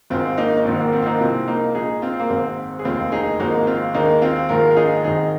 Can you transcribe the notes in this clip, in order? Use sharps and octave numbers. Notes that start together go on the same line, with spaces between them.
G#1 G#2 G#3 C4 F4
A#3 D#4
D#4
A#1 G#2 D#3 C4
A#3
C4
F4
A#3 D#4
C2 C3 F3 G#3 C4
A#3 D#4
A#1 A#2 G#3 D#4 G#4
C4 F4
A#3
G#1 G#2 G#3 C4
G#4
F1 D#2 D#3 C4 F4
D#4 G#4
G#1 G#2 F3 G#3 A#3 D#4
C4 F4
D#2 D#3 G#3 A#3 D#4
C4 F4
A#1 G#2 D#3 G#3 F4 A#4
F4
D#4 G#4
G#1 G#2 D#3 D#4 G#4